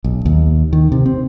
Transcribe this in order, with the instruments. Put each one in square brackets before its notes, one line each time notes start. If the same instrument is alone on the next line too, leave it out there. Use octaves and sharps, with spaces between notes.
[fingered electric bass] B1
D#2
D#3
C3
C4